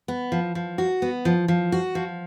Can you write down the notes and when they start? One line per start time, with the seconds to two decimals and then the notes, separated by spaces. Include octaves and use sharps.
0.08 B3
0.32 F3
0.55 F3
0.78 F#4
1.02 B3
1.25 F3
1.48 F3
1.72 F#4
1.95 F3